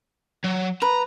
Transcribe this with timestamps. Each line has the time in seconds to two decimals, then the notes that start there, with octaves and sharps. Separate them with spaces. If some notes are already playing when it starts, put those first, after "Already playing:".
0.44 F#3
0.82 B4 A#5